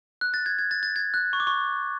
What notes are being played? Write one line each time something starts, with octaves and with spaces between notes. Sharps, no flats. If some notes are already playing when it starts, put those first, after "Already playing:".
F#6
A6
G#6
G#6
A6
A6
G#6
F#6
C#6
D6
C#6